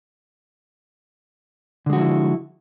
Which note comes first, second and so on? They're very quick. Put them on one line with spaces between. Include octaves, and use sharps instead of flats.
D3 G#3 F#4 F3 E4